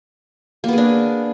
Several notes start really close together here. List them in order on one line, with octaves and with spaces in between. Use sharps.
A#3 B3 G#4 D4